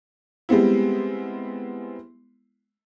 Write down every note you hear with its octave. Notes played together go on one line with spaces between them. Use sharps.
G3 G#3 B3 C4 E4